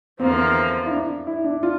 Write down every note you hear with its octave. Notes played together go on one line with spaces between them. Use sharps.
E2 D3 F3 A#3 C4
E4
D4
E4
D4
F4